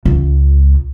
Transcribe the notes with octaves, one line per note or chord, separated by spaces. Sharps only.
C#2